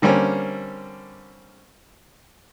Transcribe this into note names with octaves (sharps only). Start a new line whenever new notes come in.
D3 G3 A#3 C4 C#4